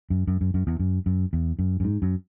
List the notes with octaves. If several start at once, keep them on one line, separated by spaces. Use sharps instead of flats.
F#2
F#2
F#2
F#2
E2
F#2
F#2
E2
F#2
F#2
G#2
F#2